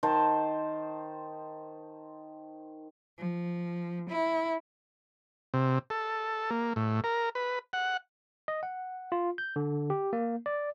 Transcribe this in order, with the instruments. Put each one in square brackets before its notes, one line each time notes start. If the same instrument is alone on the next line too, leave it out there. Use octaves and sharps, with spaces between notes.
[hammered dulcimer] D#3 C5 A5
[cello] F3
E4
[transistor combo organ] C3
A4
A#3
A2
A#4
B4
F#5
[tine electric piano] D#5
F#5
F4
G6
D3
G4
A#3
D5